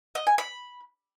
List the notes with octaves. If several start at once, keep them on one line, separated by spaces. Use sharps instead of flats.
D#5
G#5
B5